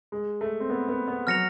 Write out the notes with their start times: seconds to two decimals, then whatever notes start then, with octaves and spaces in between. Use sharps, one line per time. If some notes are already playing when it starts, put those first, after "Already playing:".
0.12 G#3
0.41 A3
0.60 C4
0.70 B3
0.89 B3
1.07 B3
1.27 F#3 F6 A#6 C#7 F7